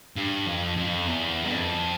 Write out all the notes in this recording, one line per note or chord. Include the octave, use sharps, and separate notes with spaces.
G2
F2
F2
E2
G2
F2